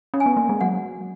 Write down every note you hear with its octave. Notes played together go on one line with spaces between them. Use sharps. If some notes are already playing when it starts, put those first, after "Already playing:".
C#4
G#5
B3
A#3
G#3
F#3 F#5